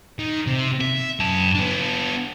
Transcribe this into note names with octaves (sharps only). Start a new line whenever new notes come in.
D#3
C3
E5
F#2 A5
B3 D4